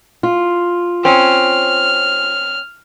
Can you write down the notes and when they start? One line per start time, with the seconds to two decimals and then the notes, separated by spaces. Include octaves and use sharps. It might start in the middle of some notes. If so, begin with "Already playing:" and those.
0.23 F4
1.05 C4 C#4 F6